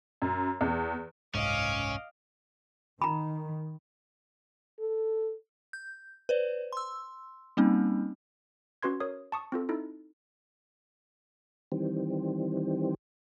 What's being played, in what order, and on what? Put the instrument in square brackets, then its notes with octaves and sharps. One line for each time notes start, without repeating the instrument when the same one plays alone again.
[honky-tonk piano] F#2
E2
[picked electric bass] F#1 C2 G#2 [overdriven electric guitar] C#4 [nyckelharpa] D#5 F5 [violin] D6
[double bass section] D#3 [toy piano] A#5 B5
[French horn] A4
[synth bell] G6
B4 C5 D5
C6 E6
G3 A#3 C4 C#4 D#4
[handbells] C#4 F#4 B4 C6 G#6
A#4 C#5 D#6
A5 C#6 D#6
C4 F4 A4
D#4 E4 A4
[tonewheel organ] D#3 E3 G3 C4